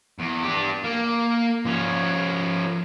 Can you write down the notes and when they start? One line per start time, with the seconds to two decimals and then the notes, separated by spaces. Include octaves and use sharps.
0.19 E2
0.43 D4 G4
0.84 A#3
1.66 F3 C#4